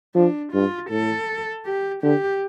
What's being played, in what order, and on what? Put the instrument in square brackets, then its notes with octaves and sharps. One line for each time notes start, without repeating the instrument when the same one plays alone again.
[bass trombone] F3 [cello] D4
[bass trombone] G2 [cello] F4
[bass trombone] A2 [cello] A4
[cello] G4
[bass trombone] D3 [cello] G4